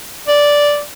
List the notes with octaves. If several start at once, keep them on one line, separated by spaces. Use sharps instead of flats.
D5